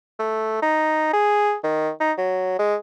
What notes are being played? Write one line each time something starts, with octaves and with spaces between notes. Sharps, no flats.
A3
D#4
G#4
D#3
D#4
F#3
G#3